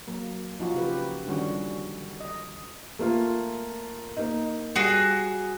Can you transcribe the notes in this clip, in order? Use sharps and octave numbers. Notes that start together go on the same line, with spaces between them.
F#3 A#3
F3 D#4 F4 F#4
C#3 G4 B4
D3 D#3 G3 C#4 F#4
D#5
A3 A#3 F4
A#3 D#4
G3 F#4 G#4 C7